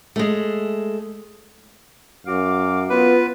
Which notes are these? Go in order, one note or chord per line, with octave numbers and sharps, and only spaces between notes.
G#3 A3
F#2 F#4 F5 D6
B3 F4 B4